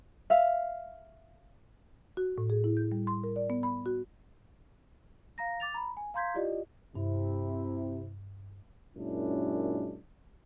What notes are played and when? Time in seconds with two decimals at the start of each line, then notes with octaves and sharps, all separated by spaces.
0.30 E5 F5
2.17 F#4
2.38 A2
2.50 G#4
2.64 E4
2.77 G6
2.92 G3
3.07 C6
3.24 A#4
3.36 D5
3.50 B3
3.63 B5
3.86 F#4
5.38 F5 A#5 A#6
5.60 D6 A6 F7
5.74 A#5 B5
5.97 G#5
6.14 F5 A#5 C6 G6 G#6 B6
6.34 E4 F4 G4 D5 D#5
6.95 G2 C3 E4
8.97 F#2 A#2 G#3 C#4 D4 E4